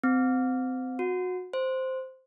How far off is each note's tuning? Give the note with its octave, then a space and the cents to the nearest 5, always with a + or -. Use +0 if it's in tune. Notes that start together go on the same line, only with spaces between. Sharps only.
C4 -25
F#4 -20
C5 -5